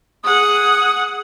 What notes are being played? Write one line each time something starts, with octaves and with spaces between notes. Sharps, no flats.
G#4 F#5 D#6